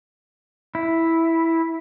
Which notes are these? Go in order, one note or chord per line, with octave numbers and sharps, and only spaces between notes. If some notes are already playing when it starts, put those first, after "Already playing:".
E4